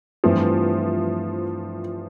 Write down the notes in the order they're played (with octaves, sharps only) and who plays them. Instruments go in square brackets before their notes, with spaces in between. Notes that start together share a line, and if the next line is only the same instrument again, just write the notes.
[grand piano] G2 E3 A3 C4 [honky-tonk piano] F3